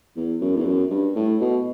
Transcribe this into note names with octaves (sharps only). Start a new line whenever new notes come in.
E2
F#2
E2
F#2
G2
A2
B2